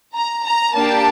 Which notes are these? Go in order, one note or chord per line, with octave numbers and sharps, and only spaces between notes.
A#5
A#5
A#3 D4 G4 A5